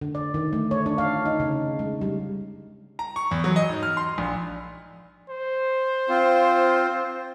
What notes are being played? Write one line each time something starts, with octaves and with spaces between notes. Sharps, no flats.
D3
D5
D#3
A3
C#5
D4
F5
D#4
C#3
G#3
G3
A#5
C#6
E2
F#3
D#5
G#2
F6
C6
A#1
C5
C4 F4